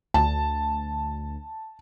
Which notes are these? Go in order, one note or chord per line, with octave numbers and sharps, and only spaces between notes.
D2 A5